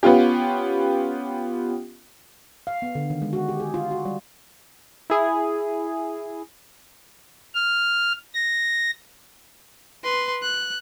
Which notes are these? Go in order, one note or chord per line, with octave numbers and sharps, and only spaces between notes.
B3 C#4 F4 G4
F5
B3
D3
D#3
G#3
F#4
G4
G#4
F4
F#4
G3
E4 G#4
F6
A#6
B4 C6
F#6